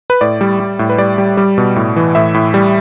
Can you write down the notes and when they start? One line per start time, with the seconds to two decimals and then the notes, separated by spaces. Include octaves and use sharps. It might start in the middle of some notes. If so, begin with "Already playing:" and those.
0.10 B4
0.21 A2 D5
0.41 G3
0.60 G3
0.79 A2
0.90 B4
0.98 G3 D5
1.18 G3
1.37 G3
1.58 B2
1.76 A2
1.96 E3
2.15 A2 E5
2.34 A2
2.54 G3